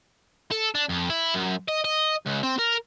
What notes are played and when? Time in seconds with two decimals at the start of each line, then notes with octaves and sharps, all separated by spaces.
0.51 A4
0.75 D4
0.89 F2
1.10 E4
1.34 F#2
1.68 D#5
1.84 D#5
2.26 C#2
2.43 C4
2.59 A#4